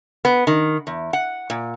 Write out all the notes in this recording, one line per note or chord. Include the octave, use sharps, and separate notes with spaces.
B3
D#3
E2
F#5
A#2